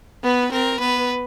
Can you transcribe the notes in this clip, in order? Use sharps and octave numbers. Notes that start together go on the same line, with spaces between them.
B3 B4
C4 A#4
B3 B4